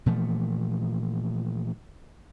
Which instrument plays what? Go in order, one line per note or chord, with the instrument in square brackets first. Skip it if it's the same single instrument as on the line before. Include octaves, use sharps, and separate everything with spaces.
[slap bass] A#2 E3 F3 A3